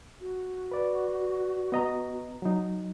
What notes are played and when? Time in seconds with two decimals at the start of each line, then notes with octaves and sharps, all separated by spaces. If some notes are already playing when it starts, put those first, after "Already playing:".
0.21 F#4
0.72 B4 D5
1.72 B3 D#5 A#5
2.42 F#3 D#4